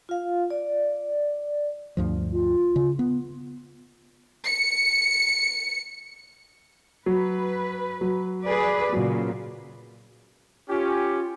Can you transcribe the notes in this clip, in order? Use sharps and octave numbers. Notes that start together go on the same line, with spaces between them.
F4 F5
D5
D2 G2 F3
F4
C#3
B3
C#7
F#3 B4
F#3
G#4 B4 D5
A#2 C#3 F#3
C#4 F4 G4